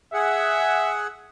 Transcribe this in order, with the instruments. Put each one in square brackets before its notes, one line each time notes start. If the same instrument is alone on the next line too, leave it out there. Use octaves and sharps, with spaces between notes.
[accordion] G#4 F#5 [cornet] E5